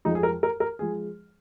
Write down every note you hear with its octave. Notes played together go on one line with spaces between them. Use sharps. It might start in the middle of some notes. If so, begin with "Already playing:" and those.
F2 F3 G#3 D#4
G#4
A#4
A#4
A#4
F3 G#3 G#4